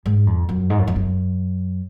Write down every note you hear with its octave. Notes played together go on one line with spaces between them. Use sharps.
G#2
F2
F#2
G#2
F#2
F2
F#2